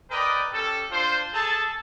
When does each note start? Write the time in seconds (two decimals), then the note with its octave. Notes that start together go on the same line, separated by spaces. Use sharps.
0.11 A#4 B4 D5 D#5 G5
0.52 C#4 G4 A4
0.90 D4 F4 C5
1.34 G#4 A4 A5